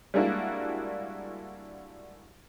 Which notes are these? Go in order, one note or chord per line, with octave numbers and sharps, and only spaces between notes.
G3 G#3 A#3 D4 E4 F#4